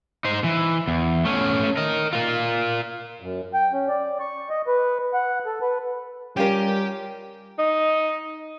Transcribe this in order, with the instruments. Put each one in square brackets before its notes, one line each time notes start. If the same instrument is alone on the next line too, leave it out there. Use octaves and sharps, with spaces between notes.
[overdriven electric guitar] D#4 C5
E3
E2
A3 C#4
A#4 D#5
F4 A#4
[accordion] F#2
G5
C#4
D5
C#6
D#5
B4
F#5
A4
B4
[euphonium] G3 [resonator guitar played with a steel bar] C#4 F4 A#4 [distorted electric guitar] G4
[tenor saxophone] D#4